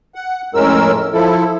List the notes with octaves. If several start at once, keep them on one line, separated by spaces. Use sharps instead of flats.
F#5
F2 A2 G#3 C#4 A#4 E6
F3 E4 A4